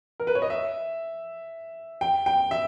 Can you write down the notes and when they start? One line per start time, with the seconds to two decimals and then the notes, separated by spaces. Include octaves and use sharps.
0.20 A#4
0.27 B4
0.35 C#5
0.42 D#5
0.50 E5
2.01 G5
2.26 G5
2.51 E5